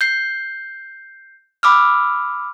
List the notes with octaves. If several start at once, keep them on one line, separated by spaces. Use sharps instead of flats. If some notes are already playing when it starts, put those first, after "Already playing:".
G6 C7
B5 D6 E6 F6